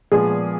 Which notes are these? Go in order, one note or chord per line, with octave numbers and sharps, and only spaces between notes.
A#2 F3 G#3 B3 G#4